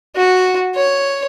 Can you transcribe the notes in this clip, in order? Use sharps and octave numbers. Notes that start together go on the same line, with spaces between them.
F#4
C#5